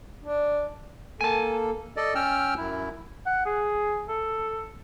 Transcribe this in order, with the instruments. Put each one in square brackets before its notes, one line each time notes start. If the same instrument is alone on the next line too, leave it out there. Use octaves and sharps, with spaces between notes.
[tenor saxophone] D4
[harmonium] A#3 A4 [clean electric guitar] G#5 A5
[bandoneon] A4 D5 D#5
C#4 G5 E6 F6
F#2 E4
[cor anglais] F#5
G#4
A4